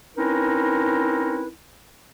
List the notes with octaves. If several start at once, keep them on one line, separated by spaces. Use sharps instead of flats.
C4 C#4 D#4 E4 A#4 B4